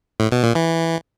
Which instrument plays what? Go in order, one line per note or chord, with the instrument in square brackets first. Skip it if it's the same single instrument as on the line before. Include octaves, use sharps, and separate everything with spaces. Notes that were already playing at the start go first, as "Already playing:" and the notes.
[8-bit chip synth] A2
B2
A#2
E3